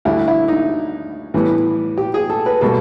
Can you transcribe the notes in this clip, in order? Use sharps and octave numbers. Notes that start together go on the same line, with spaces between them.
D2 D3 G3 E4
E4
D#4
A2 E3 G3 B3
G4
G#4
A4
B4
B2 G3 A#3 A4